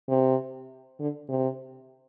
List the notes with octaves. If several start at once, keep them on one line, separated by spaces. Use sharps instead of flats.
C3
D3
C3